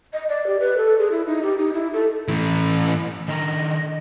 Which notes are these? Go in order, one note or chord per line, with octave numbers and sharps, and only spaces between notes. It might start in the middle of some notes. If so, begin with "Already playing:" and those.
D#5
D5
G4
B4
A4
G#4
E4
D#4
G4
D#4
E4
A4
A2 E3
D#3 D4 D#5 A#5